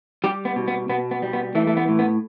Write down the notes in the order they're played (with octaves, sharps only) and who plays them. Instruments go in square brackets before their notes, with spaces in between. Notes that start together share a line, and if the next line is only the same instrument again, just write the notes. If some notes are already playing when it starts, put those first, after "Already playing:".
[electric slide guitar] G3 G4
B3
B2
B3
B2 B3
B3
G3
B3
E3 A3
A3
B3
A2
B3